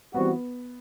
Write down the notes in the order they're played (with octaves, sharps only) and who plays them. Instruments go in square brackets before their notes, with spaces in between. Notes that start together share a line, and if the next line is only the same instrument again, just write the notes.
[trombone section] E3 G3 C4 F#4 [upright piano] B3